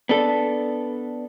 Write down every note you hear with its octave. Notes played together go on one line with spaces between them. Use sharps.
B3 D4 A4